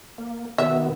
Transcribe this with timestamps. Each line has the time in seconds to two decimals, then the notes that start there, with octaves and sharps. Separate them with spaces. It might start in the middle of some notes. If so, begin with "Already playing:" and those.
0.18 A#3
0.58 B2 D#3 B3 E5